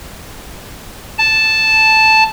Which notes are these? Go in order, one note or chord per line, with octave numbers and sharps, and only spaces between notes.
A5